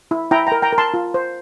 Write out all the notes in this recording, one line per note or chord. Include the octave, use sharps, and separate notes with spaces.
E4
E4 G5 A#5
G5 A#5
A#4
G5 A#5
A#4
A5 C6
F4
C5